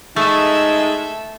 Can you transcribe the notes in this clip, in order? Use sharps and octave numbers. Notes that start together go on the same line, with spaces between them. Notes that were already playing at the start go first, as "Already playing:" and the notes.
G#3 A3 D#4 A4 E5